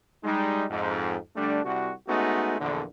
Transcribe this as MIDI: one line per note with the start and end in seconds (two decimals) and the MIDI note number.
0.24 0.65 55
0.24 0.65 56
0.24 0.65 63
0.70 1.16 41
0.70 1.16 44
1.36 1.60 50
1.36 1.60 55
1.36 1.60 57
1.36 1.60 62
1.65 1.91 36
1.65 1.91 66
2.08 2.56 56
2.08 2.56 57
2.08 2.56 59
2.08 2.56 61
2.08 2.56 63
2.08 2.56 66
2.60 2.83 34
2.60 2.83 40
2.60 2.83 50